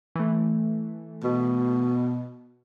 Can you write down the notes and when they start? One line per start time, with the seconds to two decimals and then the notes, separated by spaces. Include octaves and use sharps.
0.15 E3 A3
1.24 B2